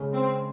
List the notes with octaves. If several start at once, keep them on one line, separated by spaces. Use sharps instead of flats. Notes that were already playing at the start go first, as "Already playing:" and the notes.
Already playing: C#3 G#3 C#4
C4